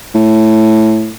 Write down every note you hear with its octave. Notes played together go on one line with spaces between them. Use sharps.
A2